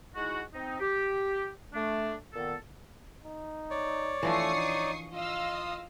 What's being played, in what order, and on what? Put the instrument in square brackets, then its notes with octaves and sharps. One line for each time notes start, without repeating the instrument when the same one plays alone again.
[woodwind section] G#3 D#4 E4 F#4
C4 D#4
G4
A3 D4
A#2 D#3 B3 A4
[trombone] D#4
[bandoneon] C#5 D5
[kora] E3 F3 D4 [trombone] A3 [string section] C#6 D#6 C7
[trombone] D#4
[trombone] F4 [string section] D#5 F5 E6
[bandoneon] D#6